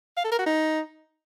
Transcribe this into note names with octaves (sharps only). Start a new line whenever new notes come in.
F5
A4
A#4
F#4
D#4